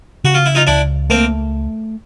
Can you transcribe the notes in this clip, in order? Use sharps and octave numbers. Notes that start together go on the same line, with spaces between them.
C#3 F#4
F4
E4
D#4 F4
C#2 D4 E4
A3 A#3 C4